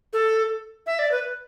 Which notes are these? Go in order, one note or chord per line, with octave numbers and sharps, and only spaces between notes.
A4
E5
D5
B4